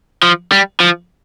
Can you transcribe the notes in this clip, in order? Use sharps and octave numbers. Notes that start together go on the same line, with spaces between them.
F3
G3
F3